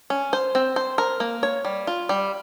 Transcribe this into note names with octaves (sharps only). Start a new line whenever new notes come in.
C#4
C5
C4
C5
A#4
A#3
C#5
G3
F4
G3